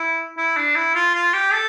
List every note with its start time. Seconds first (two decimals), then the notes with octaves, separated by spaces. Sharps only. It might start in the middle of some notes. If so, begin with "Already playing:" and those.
Already playing: E4
0.38 E4
0.57 D4
0.76 E4
0.95 F4
1.15 F4
1.34 G4
1.53 A4